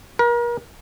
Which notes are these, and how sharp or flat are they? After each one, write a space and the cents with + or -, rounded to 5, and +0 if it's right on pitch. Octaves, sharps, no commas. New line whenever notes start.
A#4 +35